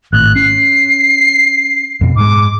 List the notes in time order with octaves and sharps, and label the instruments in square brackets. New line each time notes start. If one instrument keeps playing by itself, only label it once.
[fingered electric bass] G#1 A2 [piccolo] F#6
[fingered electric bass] C#4 [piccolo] C7
[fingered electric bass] F2 B2
[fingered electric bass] G#2 G#3 [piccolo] D6